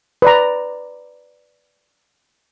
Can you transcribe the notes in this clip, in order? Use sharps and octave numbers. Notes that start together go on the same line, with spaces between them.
B4 D5 A#5